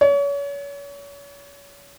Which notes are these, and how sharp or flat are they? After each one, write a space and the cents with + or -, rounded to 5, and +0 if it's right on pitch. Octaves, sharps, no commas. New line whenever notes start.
C#5 +35